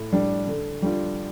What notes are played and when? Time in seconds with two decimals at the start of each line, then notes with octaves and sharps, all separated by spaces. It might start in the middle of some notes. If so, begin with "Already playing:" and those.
Already playing: A2
0.13 G3 D4
0.47 D3
0.82 G3 D4 F4